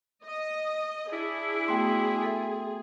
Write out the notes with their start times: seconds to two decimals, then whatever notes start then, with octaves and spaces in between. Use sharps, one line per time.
0.25 D#5
1.12 D4 E4 G#4
1.68 A3 B3 F#4 G5 C6
2.23 A4 E5